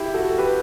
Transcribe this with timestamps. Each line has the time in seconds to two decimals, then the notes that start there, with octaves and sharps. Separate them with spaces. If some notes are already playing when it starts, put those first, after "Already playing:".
Already playing: E4 G4
0.14 F#4 A4
0.38 G4 B4